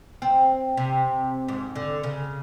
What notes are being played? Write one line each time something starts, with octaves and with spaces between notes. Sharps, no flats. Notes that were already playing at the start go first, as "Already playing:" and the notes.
C4
C3
G#2
D3
C#3